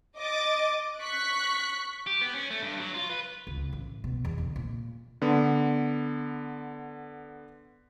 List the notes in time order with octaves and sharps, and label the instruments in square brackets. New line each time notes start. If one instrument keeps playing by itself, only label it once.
[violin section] D#5 D6 A6
C#6 F#6 B6
[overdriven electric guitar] G4
B3
C#4
A3
G2
F#3
F4
B4
[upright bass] C#2
A1
B2
E2
D3
A#2
[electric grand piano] D3 B3